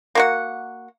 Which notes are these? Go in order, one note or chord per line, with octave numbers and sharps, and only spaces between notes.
A#3 F#4 F#5